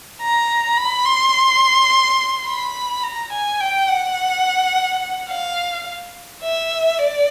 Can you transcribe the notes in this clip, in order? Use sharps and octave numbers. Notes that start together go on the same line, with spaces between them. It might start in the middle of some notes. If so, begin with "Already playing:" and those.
A#5
B5
C6
B5
A#5
G#5
G5
F#5
F5
E5
D5